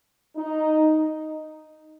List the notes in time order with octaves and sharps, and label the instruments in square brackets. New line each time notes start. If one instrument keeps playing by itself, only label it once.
[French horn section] D#4